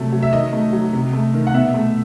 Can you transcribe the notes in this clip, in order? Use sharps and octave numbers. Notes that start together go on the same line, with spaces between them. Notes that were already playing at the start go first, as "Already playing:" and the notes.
Already playing: C3 F#3 A3
F#3
E5
D#3 D#5
A3
F#3
C3
A3
D#3
F#5
B2 E5
A3